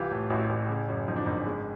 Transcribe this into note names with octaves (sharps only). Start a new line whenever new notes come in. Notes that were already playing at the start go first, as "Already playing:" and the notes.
Already playing: C2 E3 F4 G4
A2
A1 E4 F#4
A1
C#3
F#2
F3 D#4
D4
G#1 D#4
G#3